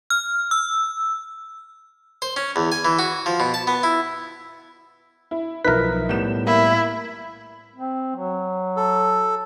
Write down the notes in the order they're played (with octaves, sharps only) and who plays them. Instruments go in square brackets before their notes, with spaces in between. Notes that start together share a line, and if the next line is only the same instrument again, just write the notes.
[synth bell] F6
E6
[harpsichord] C5
C#4
E2
G#5
E3
F#4
F3
B2
A5
B3
E4
[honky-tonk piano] E4
[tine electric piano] B1 F3 B6 [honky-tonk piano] D#4 E4 [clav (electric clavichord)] A#4 B4
[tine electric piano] A2 G3 B3 [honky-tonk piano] G6 E7
[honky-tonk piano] A#3 [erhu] E4
[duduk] C4
F#3
[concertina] A4